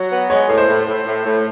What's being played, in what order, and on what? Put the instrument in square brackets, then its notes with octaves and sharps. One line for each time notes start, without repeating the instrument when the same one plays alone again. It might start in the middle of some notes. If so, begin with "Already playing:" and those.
Already playing: [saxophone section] F#3
B3
[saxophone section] G#3 [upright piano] C#5
[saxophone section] A2
[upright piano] C5
[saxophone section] A2
A2
A2
A2